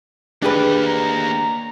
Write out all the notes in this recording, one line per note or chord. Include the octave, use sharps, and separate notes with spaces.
A#3 D4 G4 G#4 B4
A#5